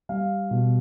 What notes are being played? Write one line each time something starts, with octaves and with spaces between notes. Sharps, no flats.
G3 F5
B2